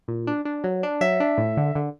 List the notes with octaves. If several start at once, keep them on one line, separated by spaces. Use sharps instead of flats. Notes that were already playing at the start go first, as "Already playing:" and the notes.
A#2
D4
D4
F#3
D4
F#3 E5
D4
A2
D3
D3